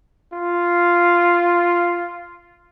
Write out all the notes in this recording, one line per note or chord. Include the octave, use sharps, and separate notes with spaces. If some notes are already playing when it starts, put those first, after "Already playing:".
F4